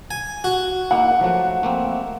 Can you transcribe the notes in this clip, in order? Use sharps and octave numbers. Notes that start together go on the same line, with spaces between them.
G#5
F#4
A#3 D#4 E4 F#5
F3 F#3 A3
A3 A#3 C4